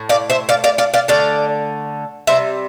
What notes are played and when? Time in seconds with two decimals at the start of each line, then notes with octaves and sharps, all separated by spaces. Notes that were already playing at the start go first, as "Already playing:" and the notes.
Already playing: A2
0.09 D5 F5
0.30 C5 E5
0.49 D5 F5
0.64 D5 F5
0.78 D5 F5
0.94 D5 F5
1.08 D3 A3 D5 F5
2.27 C3 G3 C5 E5